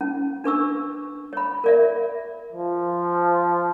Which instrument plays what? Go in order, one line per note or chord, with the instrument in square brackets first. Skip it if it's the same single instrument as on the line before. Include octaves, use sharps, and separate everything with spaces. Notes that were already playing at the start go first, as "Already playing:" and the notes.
[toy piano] C#4
D4 B4 C#6 E6
C#5 B5
A#4 D5 E5
[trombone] F3